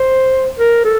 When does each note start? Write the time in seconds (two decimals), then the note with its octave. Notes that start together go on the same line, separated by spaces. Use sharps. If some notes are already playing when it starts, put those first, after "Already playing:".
Already playing: C5
0.59 A#4
0.84 A4